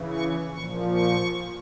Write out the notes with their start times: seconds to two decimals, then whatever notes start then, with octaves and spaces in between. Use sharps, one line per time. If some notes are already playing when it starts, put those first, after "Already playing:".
Already playing: C#3 E3
0.12 C#6
0.52 A#2 F3 C#6
0.92 C#6